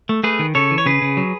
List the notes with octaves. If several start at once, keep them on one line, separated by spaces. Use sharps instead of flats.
A3
A3 G#4 B4
D#3
C#3 A4 C#5
E3
C#5
C#3 G#4 B4
C#3
F#3